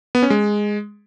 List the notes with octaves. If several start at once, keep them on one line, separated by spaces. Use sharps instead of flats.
B3
C#4
G#3